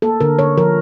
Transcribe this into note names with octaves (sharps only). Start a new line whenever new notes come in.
A#3 A4
D3 A#4
D3 C#5
F3 A#4